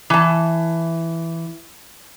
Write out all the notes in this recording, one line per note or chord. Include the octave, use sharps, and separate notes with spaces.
E3 A5